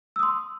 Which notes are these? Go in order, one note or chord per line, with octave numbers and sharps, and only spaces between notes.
C6 D#6 E6